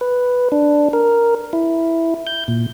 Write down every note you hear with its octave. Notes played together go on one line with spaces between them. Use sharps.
B4
D4
A#4
E4
G6
A#2